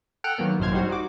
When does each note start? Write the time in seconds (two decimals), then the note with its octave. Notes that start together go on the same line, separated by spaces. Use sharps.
0.24 A4 F#5 G5 F6
0.38 D#3 F#3 A#3 B3
0.59 A1 F#2 B2 C5 F6 G#6
0.72 F#3 G3 D#4 F#4 C5
0.89 D#4 F#4 D6